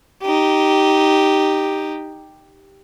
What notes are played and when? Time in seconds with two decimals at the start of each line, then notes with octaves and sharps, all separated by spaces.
0.22 D#4 G4